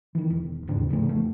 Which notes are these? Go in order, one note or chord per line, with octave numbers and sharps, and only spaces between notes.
D#3 E3
E1
D#2 G#2 C#3 D4
A1 C#3 F3 A3
F1 A3